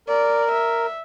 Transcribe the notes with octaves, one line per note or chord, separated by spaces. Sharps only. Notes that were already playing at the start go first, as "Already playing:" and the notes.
A#4 D5
E5